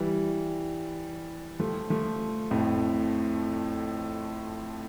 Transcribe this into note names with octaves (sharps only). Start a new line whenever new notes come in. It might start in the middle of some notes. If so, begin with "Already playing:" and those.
Already playing: E3 G3
F3 A3
F3 A3
F2 A2